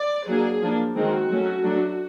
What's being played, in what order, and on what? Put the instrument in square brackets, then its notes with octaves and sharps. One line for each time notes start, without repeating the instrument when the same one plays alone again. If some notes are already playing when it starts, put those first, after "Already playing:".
Already playing: [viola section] D5
F#3 A#3 D4 G#4
F3 A#3 D4
D#3 G#3 C4 F#4
F#3 A3 C#4
F#3 A3 D4